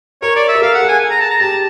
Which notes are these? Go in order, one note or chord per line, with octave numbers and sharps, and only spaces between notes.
A#4 C#5
D5
E5
A#4
A4 F5
F#5
G#4
G#5
A#5
A5
A#5
G4 A5